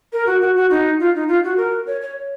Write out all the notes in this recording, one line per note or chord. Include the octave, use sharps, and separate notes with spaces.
A#4
F#4
F#4
F#4
D#4
F4
D#4
F4
F#4
A#4
C#5
C#5